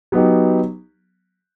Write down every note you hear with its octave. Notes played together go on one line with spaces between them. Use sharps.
F#3 B3 D#4 G4